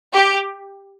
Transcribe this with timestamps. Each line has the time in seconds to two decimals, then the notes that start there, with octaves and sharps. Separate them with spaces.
0.13 G4